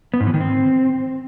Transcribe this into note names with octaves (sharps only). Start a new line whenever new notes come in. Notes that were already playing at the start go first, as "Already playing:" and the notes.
B3
G#2
E3
D#3
C4